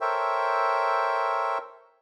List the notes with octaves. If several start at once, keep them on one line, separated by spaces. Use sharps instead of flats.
A4 A#4 C5 C#5 E5 G5